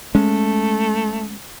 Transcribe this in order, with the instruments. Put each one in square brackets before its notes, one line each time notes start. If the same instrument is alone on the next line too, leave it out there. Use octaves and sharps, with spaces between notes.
[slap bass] G#3 C#4 [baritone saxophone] A3